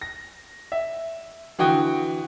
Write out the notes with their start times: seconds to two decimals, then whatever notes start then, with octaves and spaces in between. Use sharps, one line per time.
0.02 A#6
0.72 E5
1.59 D3 E3 F#4 G5 D#6